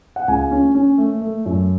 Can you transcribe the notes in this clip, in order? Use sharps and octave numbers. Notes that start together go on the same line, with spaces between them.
F#5
C#2 G#5
C#4
C#4
A3
A3
F#2